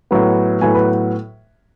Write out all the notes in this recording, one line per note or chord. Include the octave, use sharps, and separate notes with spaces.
A2 F#3 B3
A2 F#3 B3 G#5
B4